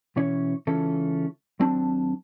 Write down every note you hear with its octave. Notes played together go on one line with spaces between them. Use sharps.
B2 E3 C#4 C#5
C#2 E3 C#4 F4 A4
D#2 F#3 C4 D4 A5